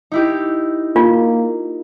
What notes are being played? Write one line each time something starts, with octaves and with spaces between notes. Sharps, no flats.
D#4 E4 G4
A#3 F4